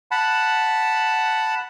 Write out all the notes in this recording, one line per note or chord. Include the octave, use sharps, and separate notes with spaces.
F#5 A5 B5